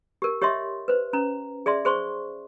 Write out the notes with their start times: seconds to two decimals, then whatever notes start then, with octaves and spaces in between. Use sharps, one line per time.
0.22 G4 A#4
0.42 G4 C#5 D#5 E5 C6
0.88 B4 C5
1.13 C#4 A#5
1.66 G#4 D5 E5 C6
1.85 G#4 C5 C6 C#6